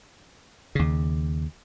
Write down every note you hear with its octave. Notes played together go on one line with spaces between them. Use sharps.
D#2 C#3